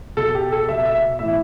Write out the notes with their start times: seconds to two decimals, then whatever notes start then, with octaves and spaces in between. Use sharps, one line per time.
0.17 B2 A4
0.35 G4
0.52 A4
0.69 B2 E5
0.86 E5
1.19 A2 E3 E5